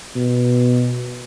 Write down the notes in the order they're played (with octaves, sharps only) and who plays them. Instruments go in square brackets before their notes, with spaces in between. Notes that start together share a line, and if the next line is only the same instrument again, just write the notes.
[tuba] B2